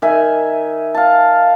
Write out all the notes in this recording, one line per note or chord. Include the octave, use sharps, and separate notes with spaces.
D#3 E5 G#5
F5 A5